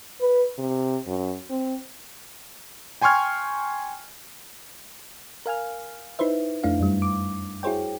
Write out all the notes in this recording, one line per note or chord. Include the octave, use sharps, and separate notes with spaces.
B4
C3
F#2
C4
G5 G#5 C6 C#6 F6 G#6
A#4 F5 G#5 F6
D#4 E4 B4 C5 E5
F2 A3 D4 E4 F5
F#2 G3
D6
E4 F#4 G#4 C5 C#5 G5